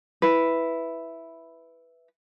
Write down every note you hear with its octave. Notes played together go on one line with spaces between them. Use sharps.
E4 B4